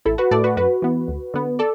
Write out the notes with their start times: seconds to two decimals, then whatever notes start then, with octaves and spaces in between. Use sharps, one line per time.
0.05 A1 E4 A4
0.18 F#4 B4
0.31 A2 A3 A4 D5
0.44 F#4 B4
0.57 F#2 F#4 B4
0.82 E3 B3
1.08 D2
1.34 D3 B3
1.59 A4 D5